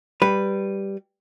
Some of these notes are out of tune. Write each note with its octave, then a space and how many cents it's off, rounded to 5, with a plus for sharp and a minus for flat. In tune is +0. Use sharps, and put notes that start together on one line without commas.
G3 +0 B4 +0